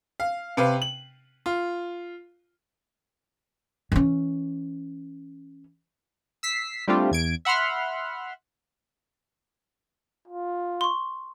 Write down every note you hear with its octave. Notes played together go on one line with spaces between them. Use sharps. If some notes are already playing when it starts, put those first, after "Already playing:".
F5
C3 B4 F5
F#7
F4
E3 C#4
E6 B6 C7
G3 A3 C4 D4 F4 G4
E2 G#6 D7
E5 F#5 B5 C6 F6
F4
C6 C#6